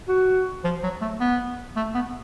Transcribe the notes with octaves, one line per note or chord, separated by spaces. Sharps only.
F#4
F3
F#3
A3
B3
A3
B3